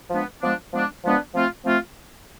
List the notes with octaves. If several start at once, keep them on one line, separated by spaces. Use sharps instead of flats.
F3 G#3 B3 D4
F3 G#3 B3 D4
F3 G#3 B3 D4
F3 G#3 B3 D4
F3 A3 C4 F4
F3 A3 C4 F4